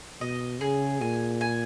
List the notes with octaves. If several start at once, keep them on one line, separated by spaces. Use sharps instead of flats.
B2 D#5
C#3 G#4
A#2 G#5
G#5